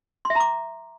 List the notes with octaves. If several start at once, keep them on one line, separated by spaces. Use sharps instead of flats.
C6
E5
A#5
D6